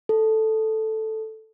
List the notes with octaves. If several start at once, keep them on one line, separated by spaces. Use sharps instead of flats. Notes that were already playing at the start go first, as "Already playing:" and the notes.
A4